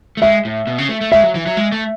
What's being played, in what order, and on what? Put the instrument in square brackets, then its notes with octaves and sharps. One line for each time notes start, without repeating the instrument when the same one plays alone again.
[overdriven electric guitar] A3
[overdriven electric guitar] G#3 [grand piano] E5
[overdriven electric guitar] A2
B2
C#3
A3
A3
[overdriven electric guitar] G#3 [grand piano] E5
[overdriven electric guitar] F#3
E3
F#3
G#3
A3